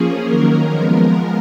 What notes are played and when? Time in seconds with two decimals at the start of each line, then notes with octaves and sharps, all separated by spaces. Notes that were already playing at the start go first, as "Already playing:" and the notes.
Already playing: F3 A#3 C#4 G#4
0.25 D#3 F#3 A#3 C#4 A#4
0.70 F3 G#3 B3